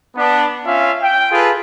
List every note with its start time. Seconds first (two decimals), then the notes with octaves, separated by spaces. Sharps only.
0.16 B3 D4
0.65 C#4 F4 E5 F5
1.01 G5
1.32 F4 G#4 A4 B4